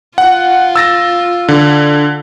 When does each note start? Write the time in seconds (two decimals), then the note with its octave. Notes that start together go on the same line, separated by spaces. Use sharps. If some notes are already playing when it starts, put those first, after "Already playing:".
0.18 F4 F#5
0.76 E6 A6 A#6
1.48 D3